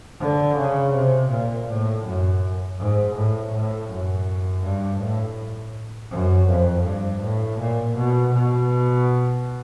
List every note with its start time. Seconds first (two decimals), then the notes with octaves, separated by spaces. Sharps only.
0.20 D3
0.57 C#3
0.94 C3
1.30 A#2
1.68 A2
2.05 F#2
2.79 G#2
3.16 A2
3.53 A2
3.89 F#2
4.64 G2
5.00 A2
6.11 F#2
6.49 F2
6.85 G2
7.22 A2
7.59 A#2
7.96 B2
8.33 B2